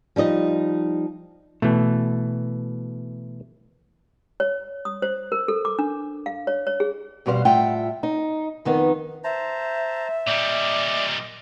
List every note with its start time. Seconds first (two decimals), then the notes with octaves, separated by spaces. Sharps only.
0.16 F3 G3 D#4 D#5
1.62 B2 E3 A3
4.40 C#5
4.85 D#6
5.02 C5
5.32 A#4
5.48 A4
5.65 D6
5.79 D4
6.26 F5
6.47 C#5
6.67 C#5
6.80 G#4
7.26 F2 B2 G3 C5 F5
7.45 A2 F4 E5 F#5 G5
8.03 D#4
8.65 F2 D#3 B3 D#4
9.24 C5 E5 A5 A#5
10.27 A#2 G3 D5 D#5